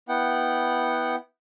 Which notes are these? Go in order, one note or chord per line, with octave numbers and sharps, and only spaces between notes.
B3 E4 F#5 G5